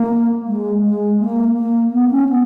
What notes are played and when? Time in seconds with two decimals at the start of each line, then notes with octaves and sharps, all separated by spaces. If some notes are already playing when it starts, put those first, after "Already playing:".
Already playing: A#3
0.47 G#3
0.84 G#3
1.20 A#3
1.57 A#3
1.92 B3
2.11 C#4
2.29 B3